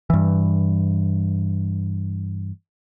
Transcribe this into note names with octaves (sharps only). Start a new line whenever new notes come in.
G2 E3